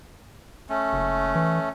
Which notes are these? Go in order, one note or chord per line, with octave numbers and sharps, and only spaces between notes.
A3 C#4
F#1
E3